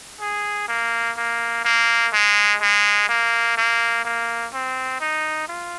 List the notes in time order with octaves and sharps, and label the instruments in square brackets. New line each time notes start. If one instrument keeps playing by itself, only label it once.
[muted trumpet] G#4
A#3
A#3
A#3
G#3
G#3
A#3
A#3
A#3
C4
D#4
F4